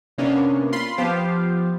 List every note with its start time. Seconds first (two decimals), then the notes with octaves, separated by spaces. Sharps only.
0.18 C3 A#3 B3 C#4 D4
0.72 F4 B5 C6
0.98 F3 B3 F4 G4 C5 F5